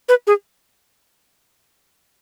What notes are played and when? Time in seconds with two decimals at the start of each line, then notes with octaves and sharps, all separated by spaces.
0.09 B4
0.27 G#4